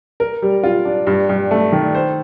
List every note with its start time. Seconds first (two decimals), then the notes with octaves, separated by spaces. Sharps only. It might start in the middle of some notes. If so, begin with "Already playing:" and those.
0.20 A#4
0.42 G3
0.64 F4
0.85 D4
1.07 G2
1.29 G2
1.51 A3
1.72 D#3
1.95 C5